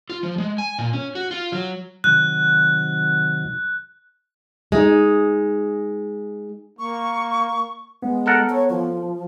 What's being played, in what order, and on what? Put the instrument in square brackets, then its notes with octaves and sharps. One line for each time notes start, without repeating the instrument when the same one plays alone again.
[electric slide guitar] F4
F3
G#3
G#5
A#2
C#4
F#4
F4
F#3
[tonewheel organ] C3 D#3 F#3 [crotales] F#6
[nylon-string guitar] G#3 D#4
[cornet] A#3 [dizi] C#6
[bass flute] G#3 [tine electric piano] B3
[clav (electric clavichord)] A4 A#4 F#5
[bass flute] C#5
F3